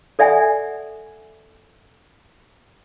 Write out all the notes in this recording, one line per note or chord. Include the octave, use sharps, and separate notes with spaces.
A4 D5 E5 F#5 G#5